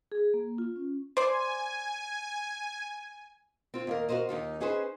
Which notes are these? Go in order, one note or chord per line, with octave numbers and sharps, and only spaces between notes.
G#4
A#3
F4
C#4
C5 D5 G#5
C4 F4
D#2 A#3 A#4
F#4 G4 A#4 C5 D#5
D#2 D#4 F4
C#4 D#4 G#4 B4 C5